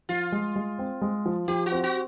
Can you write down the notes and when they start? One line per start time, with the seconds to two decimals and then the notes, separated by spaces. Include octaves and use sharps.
0.09 F3 F4
0.32 G#3
0.56 G#3
0.79 C4
1.02 G#3
1.26 F3
1.48 F3 G4
1.66 F#4
1.72 C4
1.83 F#4